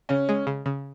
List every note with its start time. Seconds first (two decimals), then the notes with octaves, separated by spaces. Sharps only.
0.09 C#3 C#4
0.29 G#3
0.47 C#3
0.66 C#3